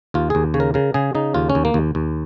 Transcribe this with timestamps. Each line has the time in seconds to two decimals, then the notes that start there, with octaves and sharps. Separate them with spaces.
0.14 D#2 F4
0.30 D#2 G#4
0.54 C#3 C#5
0.60 A#4
0.74 C#3 A#4
0.94 C#3 G#4
1.15 C#3 D#4
1.34 D#2 F4
1.50 C#4
1.55 D#2
1.65 A#3
1.74 D#2
1.95 D#2